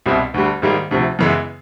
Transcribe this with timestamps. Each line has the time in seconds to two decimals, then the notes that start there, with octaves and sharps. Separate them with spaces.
0.06 C2 B2 G3 C4 E4
0.34 D2 D3 G3
0.62 G#2 D#3 G3 A#3
0.91 D2 C3 F3
1.19 F#2 C#3 E3 G#3 B3